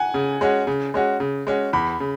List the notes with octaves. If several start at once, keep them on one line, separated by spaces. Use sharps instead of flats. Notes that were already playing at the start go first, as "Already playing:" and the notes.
Already playing: F#5 G#5
C#3
G#3 C#4 F#4
C#3
G#3 C#4 F#4
C#3
G#3 C#4 F#4
E2 B5
C#3